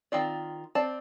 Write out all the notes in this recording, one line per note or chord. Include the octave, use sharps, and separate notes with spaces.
D#3 C4 F4 D5
C4 D5 A5